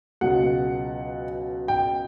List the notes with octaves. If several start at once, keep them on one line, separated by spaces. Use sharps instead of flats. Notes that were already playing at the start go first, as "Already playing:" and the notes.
C#2 B2 F#3 F#5
G5